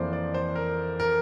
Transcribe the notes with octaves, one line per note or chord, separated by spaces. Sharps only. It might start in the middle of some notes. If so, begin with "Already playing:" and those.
Already playing: F2 E3 A#3 C5 D5
D5
C5
A#4
A#4